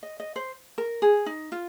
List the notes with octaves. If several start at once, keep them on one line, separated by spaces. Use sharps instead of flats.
D#5
D#5
C5
A#4
G#4
D#4
F4